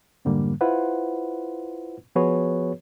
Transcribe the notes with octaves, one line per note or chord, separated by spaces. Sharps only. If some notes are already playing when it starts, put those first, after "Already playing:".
F2 G#2 D3 G3 A#3
E4 F4 B4 C5 F#5
F3 B3 F#4 G#4 B4 C#5